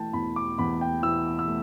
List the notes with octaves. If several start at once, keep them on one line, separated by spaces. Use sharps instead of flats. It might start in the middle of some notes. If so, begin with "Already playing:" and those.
Already playing: E3 A3 G5 A5
E2 B5
D6
E2 B5
G5
E3 E6
E6
A3